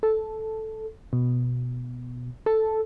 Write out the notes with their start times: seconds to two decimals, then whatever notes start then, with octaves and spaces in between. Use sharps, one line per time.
0.03 A4
1.13 B2
2.46 A4